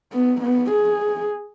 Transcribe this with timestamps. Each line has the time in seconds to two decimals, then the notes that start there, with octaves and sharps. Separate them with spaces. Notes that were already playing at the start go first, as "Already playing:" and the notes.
0.13 B3
0.41 B3
0.71 G#4